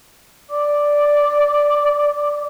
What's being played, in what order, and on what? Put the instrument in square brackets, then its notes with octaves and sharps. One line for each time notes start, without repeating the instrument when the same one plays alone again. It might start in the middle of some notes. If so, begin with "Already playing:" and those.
[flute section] D5 D6